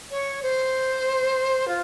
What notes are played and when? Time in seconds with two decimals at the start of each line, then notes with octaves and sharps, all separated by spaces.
0.10 C#5
0.42 C5
1.68 F4